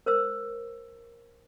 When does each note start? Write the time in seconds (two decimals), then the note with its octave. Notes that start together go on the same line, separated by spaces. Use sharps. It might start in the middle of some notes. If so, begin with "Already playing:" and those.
0.06 A#4 C5 E6